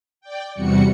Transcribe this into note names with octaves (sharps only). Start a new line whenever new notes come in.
D5 G5
E2 C3 G3 F#4 C#7